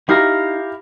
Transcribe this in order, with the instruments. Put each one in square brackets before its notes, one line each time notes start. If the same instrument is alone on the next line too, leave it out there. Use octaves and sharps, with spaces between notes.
[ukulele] D#4 [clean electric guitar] E4 F5 A#5 [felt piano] G4